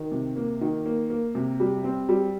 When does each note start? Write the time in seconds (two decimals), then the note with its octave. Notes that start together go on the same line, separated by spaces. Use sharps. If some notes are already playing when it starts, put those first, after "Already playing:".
Already playing: D#3
0.11 C3
0.36 A#3
0.61 D#3
0.86 A#3
1.10 A#3
1.35 C3
1.60 G3
1.84 C4
2.09 G3